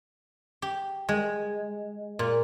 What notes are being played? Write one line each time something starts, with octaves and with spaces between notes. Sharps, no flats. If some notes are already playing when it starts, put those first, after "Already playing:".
G4
G#3
A#2